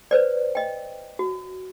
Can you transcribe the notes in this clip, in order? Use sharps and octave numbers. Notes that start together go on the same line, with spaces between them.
B4 C5 D5
D#5 G5
F#4